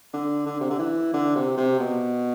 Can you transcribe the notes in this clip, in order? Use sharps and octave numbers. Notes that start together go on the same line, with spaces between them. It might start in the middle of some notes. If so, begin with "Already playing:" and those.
D3
D3
C3
D3
E3
D3
C3
C3
B2